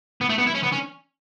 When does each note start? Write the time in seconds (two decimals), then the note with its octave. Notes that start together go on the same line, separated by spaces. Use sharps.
0.21 B3
0.30 A3
0.38 B3
0.47 E4
0.55 C#4
0.63 B3
0.73 C#4